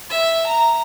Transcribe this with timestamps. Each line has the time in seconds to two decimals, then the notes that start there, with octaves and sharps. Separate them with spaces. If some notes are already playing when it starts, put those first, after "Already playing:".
0.10 E5
0.46 A#5